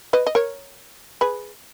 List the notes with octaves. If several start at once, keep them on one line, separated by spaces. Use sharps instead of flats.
B4 D#5
D#5
A#4 C#5
G#4 B4